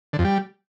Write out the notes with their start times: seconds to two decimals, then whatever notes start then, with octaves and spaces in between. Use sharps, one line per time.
0.13 D3
0.19 F2
0.24 G3